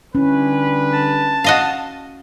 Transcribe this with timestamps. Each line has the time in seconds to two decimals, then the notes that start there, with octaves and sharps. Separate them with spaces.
0.15 D3 G3 C#4 E4 B4
0.93 A5
1.44 F#4 D#5 F5